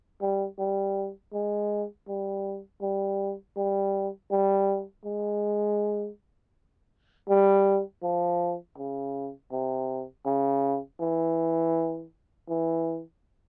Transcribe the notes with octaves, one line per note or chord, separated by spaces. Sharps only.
G3
G3
G#3
G3
G3
G3
G3
G#3
G3
F3
C#3
C3
C#3
E3
E3